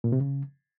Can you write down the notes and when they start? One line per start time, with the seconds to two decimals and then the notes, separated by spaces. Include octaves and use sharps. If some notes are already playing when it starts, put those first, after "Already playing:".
0.04 A#2
0.12 C3
0.21 C#3